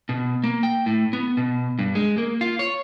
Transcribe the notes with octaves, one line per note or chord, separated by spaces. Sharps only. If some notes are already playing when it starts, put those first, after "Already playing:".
B2
A#3
G5
A2
B3
B2
G2
G#3
A#3
F4
C#5